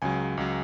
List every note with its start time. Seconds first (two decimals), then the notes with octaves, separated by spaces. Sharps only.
0.02 C#2 C#3 F#3 G#5
0.37 C#2 C#3 F#3